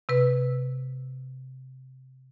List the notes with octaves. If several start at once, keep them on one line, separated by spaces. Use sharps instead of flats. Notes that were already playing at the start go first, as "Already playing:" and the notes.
C3 B4